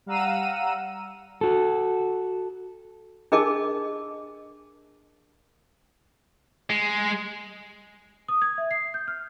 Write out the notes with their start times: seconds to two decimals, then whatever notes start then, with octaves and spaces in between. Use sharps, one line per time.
0.06 G3 F5 F#5 A#5 E6 D#7
1.41 F#4 A4
3.32 D4 G#4 A#4 D#5 A5 D6
6.70 G#3
8.28 D#6
8.42 G#6
8.58 E5
8.71 C7
8.94 G6
9.08 F6